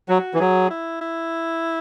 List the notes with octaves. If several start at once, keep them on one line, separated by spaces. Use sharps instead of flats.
F#3 F#4
E3
F#3 G#4
E4
E4